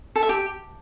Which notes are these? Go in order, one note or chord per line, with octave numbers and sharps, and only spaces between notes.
A4
E5
G4